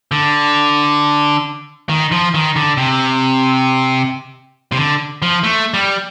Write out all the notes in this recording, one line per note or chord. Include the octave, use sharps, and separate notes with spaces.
D3
D#3
F3
D#3
D3
C3
C3
D3
F3
A3
G3